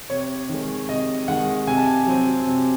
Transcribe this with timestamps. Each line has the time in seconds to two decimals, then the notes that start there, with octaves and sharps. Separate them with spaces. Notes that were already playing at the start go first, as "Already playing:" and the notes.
0.10 C3 C#5
0.49 D#3 G#3
0.89 C3 D#5
1.28 D#3 G#3 F#5
1.67 C3 G#5
1.77 A5
1.87 G#5
2.07 F#3 C4
2.46 C3